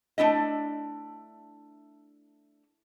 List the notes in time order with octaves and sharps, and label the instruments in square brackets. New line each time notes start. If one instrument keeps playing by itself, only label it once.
[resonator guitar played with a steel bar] A3 D4 E4 D#5